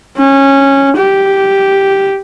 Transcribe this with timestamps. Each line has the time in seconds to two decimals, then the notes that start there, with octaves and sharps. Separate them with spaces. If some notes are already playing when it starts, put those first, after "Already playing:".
0.17 C#4
0.97 G4